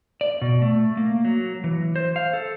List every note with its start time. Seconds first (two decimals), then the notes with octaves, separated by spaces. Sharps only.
0.21 D5
0.41 B2
0.62 A3
0.97 A#3
1.25 F#3
1.64 E3
1.96 C5
2.16 F5
2.33 A4